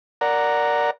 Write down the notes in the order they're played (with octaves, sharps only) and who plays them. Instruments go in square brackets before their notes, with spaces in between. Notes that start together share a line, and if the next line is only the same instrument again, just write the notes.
[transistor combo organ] A#4 D5 F#5 A#5